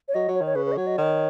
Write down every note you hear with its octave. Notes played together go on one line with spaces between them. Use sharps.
C#5
F#3 D#5
F#3
C#5
D#3
C#5
C#3 B4
B4
D#5
F#3 C#5
D#5
D#3 C#5